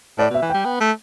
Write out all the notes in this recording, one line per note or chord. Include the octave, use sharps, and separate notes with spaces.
A2 D5
B2
E5
E3
G3 G5
B3
A3